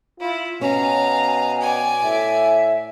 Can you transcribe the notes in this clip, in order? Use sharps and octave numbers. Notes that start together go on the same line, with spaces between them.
E4 F4
B2 C#4 F5 G#5 A#5
D5 G5 G#5
A2 E5